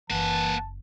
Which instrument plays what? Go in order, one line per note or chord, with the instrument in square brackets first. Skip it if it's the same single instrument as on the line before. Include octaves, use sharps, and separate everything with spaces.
[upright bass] F#1 [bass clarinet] E3 [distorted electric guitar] A#3 F#5 [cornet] A5